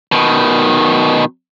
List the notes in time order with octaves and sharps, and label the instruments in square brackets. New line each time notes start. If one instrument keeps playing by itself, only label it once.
[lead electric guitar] B2 D#3